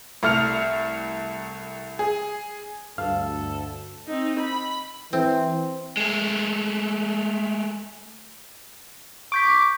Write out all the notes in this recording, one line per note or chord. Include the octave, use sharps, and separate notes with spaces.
C2 A3 F6 C#7 F7
G#4
D2 G2 A4 F5
C4 D#4
B5
E3 C4
G#3 A3
C#6 D6 G6 B6